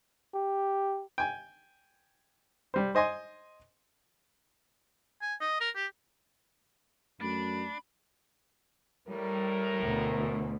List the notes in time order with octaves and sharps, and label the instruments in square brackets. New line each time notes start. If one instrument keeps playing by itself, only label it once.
[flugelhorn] G4
[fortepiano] G5 G#5
G3 C5
C5 D#5 G#5 C6
[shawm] G#5
D#5
A#4
G4
[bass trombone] F#2 [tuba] A3 [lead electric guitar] D4 [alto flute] B5
[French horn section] A2 A#4 [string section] G3
[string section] D2 B2